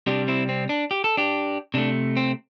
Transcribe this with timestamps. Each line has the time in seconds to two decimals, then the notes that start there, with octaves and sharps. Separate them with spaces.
0.07 C3 G3 D4 G4
0.28 C4 E4
0.49 C4
0.69 D4
0.91 G4
1.04 A4
1.17 D4 G4
1.74 C3 A3 D4
2.17 C4